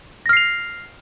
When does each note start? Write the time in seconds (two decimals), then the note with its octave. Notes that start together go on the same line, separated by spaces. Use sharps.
0.26 A#6
0.29 F6
0.33 C7
0.37 F7